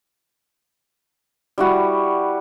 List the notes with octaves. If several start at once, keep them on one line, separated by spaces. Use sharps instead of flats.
G3 E4 F#4